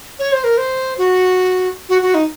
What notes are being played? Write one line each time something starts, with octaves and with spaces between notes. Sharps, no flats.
C#5
C5
A#4
C5
F#4
F#4
F#4
D#4